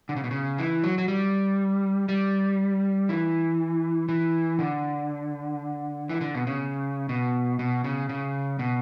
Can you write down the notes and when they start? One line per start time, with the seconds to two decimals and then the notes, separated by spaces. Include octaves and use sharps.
0.09 D3
0.16 C#3
0.24 B2
0.31 C#3
0.58 E3
0.84 F#3
0.98 F#3
1.08 G3
2.09 G3
3.09 E3
4.09 E3
4.59 D3
6.09 E3
6.21 D3
6.35 B2
6.47 C#3
7.09 B2
7.59 B2
7.84 C#3
8.09 C#3
8.59 B2